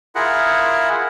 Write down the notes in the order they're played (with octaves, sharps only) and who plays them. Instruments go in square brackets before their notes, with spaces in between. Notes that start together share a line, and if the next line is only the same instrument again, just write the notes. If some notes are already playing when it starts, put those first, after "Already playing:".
[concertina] E4 F4 G#4 A#4 F#5